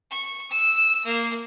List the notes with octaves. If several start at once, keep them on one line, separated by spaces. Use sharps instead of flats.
C#6
E6
A#3